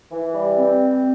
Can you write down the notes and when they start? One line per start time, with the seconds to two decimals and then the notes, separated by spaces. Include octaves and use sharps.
0.12 E3
0.35 G3
0.56 C4